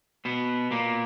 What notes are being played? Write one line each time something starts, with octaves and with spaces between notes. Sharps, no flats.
B2 B3
A#2 A#3